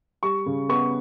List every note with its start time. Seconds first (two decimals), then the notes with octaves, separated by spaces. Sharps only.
0.23 G3 C#6
0.46 C#3
0.69 B3 C#6